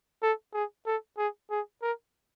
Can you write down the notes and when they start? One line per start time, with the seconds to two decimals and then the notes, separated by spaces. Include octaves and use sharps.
0.23 A4
0.54 G#4
0.86 A4
1.18 G#4
1.51 G#4
1.82 A#4